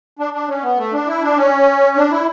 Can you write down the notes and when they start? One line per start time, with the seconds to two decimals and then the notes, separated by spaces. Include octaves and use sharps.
0.19 D4
0.34 D4
0.48 C#4
0.63 B3
0.78 A3
0.93 D4
1.07 E4
1.23 D4
1.37 C#4
1.96 D4
2.11 E4